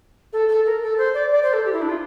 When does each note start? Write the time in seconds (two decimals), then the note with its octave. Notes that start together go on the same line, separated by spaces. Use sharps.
0.32 A4
0.48 A4
0.66 A#4
0.82 A4
0.97 C5
1.14 D5
1.32 D5
1.42 C5
1.53 A4
1.65 G4
1.73 E4
1.81 D4
1.89 F4